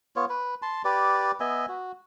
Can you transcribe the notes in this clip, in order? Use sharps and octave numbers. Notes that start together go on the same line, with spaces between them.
B3 F4 C#5
B4
A5 C6
G4 B4 D5
B3 D#5 E5 G#5
F#4